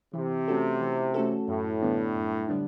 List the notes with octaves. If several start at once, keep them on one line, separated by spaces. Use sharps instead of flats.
C3 E3
A3 C#4 F#4 A4
E3
A3 C#4 F#4 A4
F#2 A2
D3 G3 B3 D4
F#2
D3 G3 B3 D4